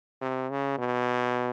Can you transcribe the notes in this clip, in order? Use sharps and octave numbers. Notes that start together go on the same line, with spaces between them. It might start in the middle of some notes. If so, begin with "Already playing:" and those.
C3
C#3
B2